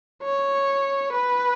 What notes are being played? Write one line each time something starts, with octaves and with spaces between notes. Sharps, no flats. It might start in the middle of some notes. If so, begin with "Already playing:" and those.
C#5
B4